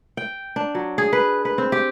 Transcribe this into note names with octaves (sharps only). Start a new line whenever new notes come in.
G5
D4
F#3
G#4
B4
B4
C4
G4